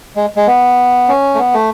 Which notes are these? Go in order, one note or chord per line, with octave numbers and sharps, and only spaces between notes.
G#3
G#3
B3
C#4
A3
B3
A3